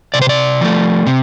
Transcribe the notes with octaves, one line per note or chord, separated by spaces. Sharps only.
C3 D5
C5
D5
F3 A3
C3